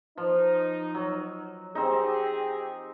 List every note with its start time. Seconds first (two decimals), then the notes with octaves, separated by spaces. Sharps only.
0.18 F3 D#4
0.95 F#3
1.75 C4 D#4 G4 G#4